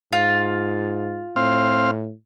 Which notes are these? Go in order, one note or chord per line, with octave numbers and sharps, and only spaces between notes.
G#2 F4
A2 C4 F5